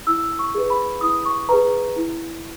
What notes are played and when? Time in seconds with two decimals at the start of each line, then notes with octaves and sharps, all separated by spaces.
0.07 E4 E6
0.39 C#6
0.55 G#4 B4
0.70 B5
1.01 E4 D#6
1.25 C#6
1.49 G#4 B4 A#5
1.96 E4